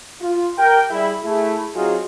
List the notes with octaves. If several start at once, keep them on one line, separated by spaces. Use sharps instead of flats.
F4
G4 A#4 G5
G3 E4 G#4 E5
A3 E4 G#4
F#3 C4 D#4 F4 F#4 G#4